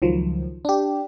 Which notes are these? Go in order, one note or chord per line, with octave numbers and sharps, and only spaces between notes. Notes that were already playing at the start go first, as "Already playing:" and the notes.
C#2 D#3 F3 F#3
D4 G4